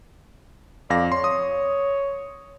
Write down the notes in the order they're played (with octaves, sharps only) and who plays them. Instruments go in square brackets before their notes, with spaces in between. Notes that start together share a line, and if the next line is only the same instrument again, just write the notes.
[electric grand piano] F2 F5 A#6 [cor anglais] D5
[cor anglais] C#5 [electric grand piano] C6
[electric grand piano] D#6